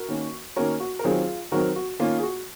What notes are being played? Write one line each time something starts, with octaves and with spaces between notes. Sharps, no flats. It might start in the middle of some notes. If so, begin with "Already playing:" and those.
Already playing: F#4 A#4
D#3 A#3 C#4
D#3 A#3 C#4 F#4 A#4
F#4
A#4
D#3 F#3 C4 F4 G#4
D#3 F#3 C4 F#4 A#4
F#4
D#3 A#3 C#4 F4
G#4
F#4